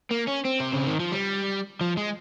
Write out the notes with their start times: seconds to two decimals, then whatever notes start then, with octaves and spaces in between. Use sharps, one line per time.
0.11 A#3
0.28 C#4
0.45 C4
0.60 C3
0.73 C#3
0.87 D#3
1.00 F3
1.12 G3
1.81 F3
1.97 G#3